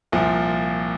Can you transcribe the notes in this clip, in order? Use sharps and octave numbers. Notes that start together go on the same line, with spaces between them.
C2 A#2 F3